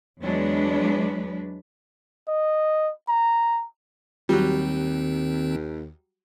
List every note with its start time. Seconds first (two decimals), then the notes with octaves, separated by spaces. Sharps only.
0.21 E2 F#3 G#3 D4 B4
2.28 D#5
3.09 A#5
4.29 D#2 D#3 F#3 G3 C4